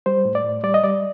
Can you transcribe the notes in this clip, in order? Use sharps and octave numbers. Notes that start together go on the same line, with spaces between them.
G3 C5
A2
D5
A2
G3 D5
D#5
G3 D5